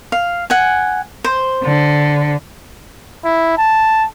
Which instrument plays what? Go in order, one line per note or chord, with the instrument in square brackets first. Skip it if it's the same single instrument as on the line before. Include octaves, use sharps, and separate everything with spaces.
[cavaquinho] F5
F#5 G#5
C5
[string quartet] D3
[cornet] E4
A5